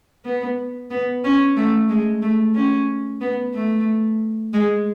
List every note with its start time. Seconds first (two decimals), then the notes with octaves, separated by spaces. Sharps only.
0.25 B3
0.90 B3
1.24 C#4
1.57 A3
1.89 G#3
2.22 A3
2.55 C#4
3.21 B3
3.54 A3
4.53 G#3